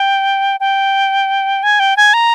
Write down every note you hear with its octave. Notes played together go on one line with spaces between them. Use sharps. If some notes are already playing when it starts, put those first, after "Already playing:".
Already playing: G5
G5
G#5
G5
G#5
A#5